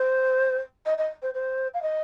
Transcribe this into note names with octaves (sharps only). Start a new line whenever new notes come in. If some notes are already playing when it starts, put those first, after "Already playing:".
Already playing: C5
D#5
D#5
C5
C5
F5
D#5